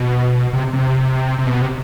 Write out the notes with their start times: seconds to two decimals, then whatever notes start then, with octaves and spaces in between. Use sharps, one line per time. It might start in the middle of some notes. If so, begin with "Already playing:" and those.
Already playing: B2
0.53 C3
0.73 C3
1.38 C3
1.47 B2
1.61 C3